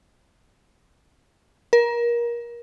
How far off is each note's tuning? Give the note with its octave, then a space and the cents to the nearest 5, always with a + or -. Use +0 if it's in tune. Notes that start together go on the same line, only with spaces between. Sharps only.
A#4 +25